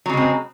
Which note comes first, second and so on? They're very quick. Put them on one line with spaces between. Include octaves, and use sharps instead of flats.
F#3 C#3 G#3 C4